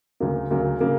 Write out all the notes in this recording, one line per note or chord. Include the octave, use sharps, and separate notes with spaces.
D2 C#3 F#3 A#3
D2 C#3 F#3 A#3
C#3 F#3 A#3